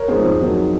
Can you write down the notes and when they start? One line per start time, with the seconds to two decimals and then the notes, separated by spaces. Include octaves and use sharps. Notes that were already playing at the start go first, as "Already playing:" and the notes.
Already playing: A#4 C#5
0.08 G#2 F3 C4 G#4 C5
0.25 F2
0.40 D#3 F#3 C4